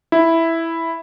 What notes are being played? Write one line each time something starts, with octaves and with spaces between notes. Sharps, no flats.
E4